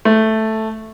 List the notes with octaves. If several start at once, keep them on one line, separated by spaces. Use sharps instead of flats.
A3